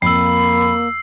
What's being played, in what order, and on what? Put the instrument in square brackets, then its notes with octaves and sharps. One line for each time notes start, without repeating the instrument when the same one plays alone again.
[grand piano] F2 [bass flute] A#3 [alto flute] B5 [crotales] E6 C7